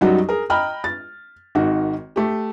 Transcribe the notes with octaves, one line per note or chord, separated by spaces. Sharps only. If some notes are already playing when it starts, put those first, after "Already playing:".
F#2 F#3 G3 D#4 F#4
G#4 A#4
D#5 G5 A#5 B5 F6
A6
G#1 D#3 F#4
A3 G4